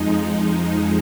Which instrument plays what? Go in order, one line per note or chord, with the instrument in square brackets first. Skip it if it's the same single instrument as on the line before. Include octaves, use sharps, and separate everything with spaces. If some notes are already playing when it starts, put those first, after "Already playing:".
Already playing: [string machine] F2 F3 G#3 D#4